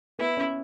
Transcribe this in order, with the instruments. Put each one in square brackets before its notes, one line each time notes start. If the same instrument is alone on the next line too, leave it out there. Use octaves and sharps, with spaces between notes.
[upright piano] B3 [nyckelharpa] E4
[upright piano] C#4